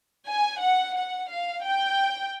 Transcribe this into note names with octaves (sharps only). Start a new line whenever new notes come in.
G#5
F#5
F#5
F5
G5